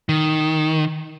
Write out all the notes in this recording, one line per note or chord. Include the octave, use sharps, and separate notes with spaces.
D#3